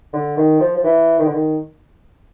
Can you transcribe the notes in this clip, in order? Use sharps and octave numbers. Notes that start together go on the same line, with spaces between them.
D3
D#3
F3
F3
E3
D#3
D3
D#3